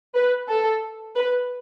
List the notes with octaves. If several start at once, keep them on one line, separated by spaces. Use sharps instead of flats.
B4
A4
B4